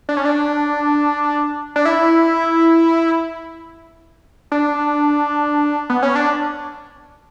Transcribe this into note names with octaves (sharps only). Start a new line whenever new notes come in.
D4
C#4
D4
D4
E4
D4
B3
C#4
D4